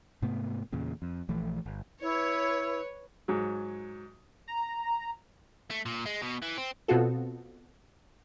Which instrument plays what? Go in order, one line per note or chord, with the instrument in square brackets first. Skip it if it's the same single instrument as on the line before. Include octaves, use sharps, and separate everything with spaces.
[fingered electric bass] G#2 C3 A3 B3
E2 A#2 C#3
F2
A#1 E3 F3 A3
G1
[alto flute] E4 [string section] B4 C#5
[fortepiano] G#2 F#3
[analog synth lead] A#5
[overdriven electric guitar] A3
A#2
G#3
B2
E3
C4
[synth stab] B2 B3 C4 F4 F#4 A4